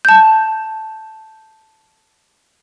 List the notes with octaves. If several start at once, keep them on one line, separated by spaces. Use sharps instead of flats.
A5 G6